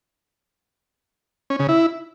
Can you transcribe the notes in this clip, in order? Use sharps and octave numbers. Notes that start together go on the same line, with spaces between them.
C#4
C#3
E4